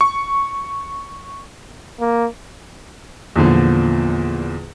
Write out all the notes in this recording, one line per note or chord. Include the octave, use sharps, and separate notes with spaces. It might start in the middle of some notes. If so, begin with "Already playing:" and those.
C#6
A#3
E2 A#2 D3 F3